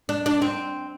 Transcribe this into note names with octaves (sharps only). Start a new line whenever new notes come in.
D4
D4
C4